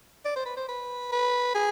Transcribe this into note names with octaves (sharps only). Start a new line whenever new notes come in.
D5
C5
B4
C5
B4
B4
G#4